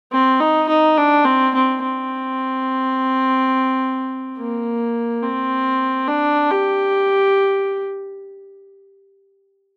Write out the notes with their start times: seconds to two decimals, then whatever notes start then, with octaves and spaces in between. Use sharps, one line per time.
0.12 C4
0.40 D#4
0.69 D#4
0.98 D4
1.25 C4
1.54 C4
1.82 C4
4.37 A#3
5.23 C4
6.07 D4
6.51 G4